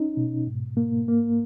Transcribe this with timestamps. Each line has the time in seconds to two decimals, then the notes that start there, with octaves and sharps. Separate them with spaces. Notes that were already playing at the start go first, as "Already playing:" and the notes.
Already playing: C#4 D#4
0.17 B2
0.47 G#2
0.77 A#3
1.08 A#3